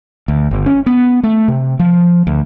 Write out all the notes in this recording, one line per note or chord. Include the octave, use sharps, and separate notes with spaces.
D2
G1
C#4
B3
A3
C3
F3
D2